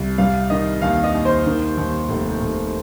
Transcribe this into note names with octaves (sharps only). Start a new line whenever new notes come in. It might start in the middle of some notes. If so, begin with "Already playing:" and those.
Already playing: C2
G3 F5
D#3 D#5
D#2 F5
D#5
D#2
C5
D#3
D#2
F1
F1